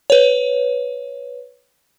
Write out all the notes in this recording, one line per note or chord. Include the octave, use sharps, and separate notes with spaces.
B4 C#5